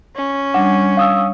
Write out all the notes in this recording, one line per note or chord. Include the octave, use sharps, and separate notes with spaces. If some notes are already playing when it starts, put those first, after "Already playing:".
C#4
G3 D4 F#5
F5 D#6 E6